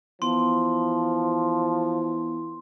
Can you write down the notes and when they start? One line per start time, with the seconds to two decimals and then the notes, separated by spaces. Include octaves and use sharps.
0.22 E3 F3 B3 C6